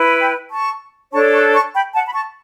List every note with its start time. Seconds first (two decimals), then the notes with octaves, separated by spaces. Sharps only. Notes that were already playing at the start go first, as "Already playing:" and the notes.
Already playing: E4 B4
0.20 G5 B5
0.51 A5 C#6
1.13 D4 A4 C#5 A5 C#6
1.33 A5 C#6
1.54 A5 C#6
1.75 G5 B5
1.94 F#5 A5
2.07 B5
2.14 A5 C#6